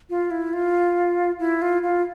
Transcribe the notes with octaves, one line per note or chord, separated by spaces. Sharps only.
F4
E4
F4
E4
F4
F4